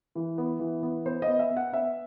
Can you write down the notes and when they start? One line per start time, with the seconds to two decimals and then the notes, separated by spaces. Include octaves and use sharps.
0.15 E3
0.38 B3
0.59 E3
0.83 B3
1.06 B3 C5
1.22 D#5
1.28 B3
1.39 E5
1.50 B3
1.57 F#5
1.72 B3 E5